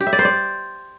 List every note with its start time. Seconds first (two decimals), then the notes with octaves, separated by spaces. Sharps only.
0.01 G4
0.07 E5
0.13 D5
0.19 C5
0.25 D5